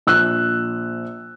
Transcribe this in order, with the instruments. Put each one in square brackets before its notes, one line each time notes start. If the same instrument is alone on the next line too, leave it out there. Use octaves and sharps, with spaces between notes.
[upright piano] A#1 E6 F#6